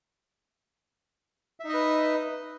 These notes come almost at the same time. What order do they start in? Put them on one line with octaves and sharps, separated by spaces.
E5 D#4 D#5 B4